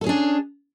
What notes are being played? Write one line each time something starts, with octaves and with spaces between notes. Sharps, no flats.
C#4 D4 G#4 A4